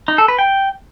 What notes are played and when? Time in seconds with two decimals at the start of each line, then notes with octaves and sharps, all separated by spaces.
0.08 D#4
0.18 A4
0.28 B4
0.39 G5